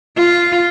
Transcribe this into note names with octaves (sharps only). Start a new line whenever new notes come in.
F4